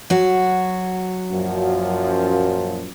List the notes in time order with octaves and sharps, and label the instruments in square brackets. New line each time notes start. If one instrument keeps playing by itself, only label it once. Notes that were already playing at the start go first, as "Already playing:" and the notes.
[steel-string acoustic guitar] F#3 F#4
[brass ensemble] F#2 A#2 F3